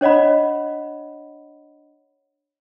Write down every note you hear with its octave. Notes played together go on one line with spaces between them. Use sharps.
D4 C#5 D#5 F#5 B5